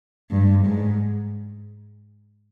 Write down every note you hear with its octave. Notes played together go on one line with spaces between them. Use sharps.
G2
G#2